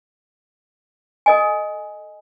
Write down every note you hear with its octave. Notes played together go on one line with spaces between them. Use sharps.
A4 D#5 G#5